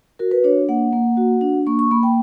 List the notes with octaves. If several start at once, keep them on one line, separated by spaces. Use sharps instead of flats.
F#4 A#4
B4
D4 C#5
A#3 F#5
A#3
F#4
D4
A#3 C#6
C#6
A#3 B5
G5